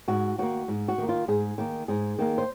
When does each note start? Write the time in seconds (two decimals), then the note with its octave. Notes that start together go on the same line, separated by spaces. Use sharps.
0.08 G#2 F#4
0.38 D#3 A#3 F#4
0.68 G#2
0.88 F#4
0.98 D#3 A#3
1.09 F4
1.28 G#2 G#4
1.58 D#3 A#3
1.88 G#2 G#4
2.19 D#3 A#3
2.38 C5